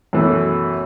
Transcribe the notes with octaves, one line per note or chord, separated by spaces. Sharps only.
F#2 B2 E3 A3